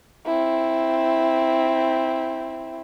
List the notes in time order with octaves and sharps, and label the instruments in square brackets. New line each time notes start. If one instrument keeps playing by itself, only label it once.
[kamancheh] C4 E4